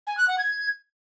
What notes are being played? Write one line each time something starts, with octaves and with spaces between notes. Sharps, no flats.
G#5
F#6
F#5
G#6